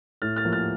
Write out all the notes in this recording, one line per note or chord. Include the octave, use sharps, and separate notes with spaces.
A2 F6 A6
F6 A6
F3 A#3
F6 A6